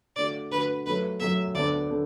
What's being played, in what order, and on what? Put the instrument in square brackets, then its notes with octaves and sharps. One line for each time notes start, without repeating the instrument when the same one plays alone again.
[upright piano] D3 A3 F#4 [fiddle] D5
[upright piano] D3 A3 F#4 [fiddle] B4
[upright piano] F#2 F#3 A3 [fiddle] B4
[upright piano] F#2 F#3 A3 [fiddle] E5
[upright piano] D2 D3 B3 D4 A4 [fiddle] D5
[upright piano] D3 B3 A4